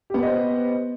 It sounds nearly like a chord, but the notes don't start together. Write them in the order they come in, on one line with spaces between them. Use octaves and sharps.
G4 B3 B4 D#5 C5